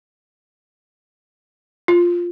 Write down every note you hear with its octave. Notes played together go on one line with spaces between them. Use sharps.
F4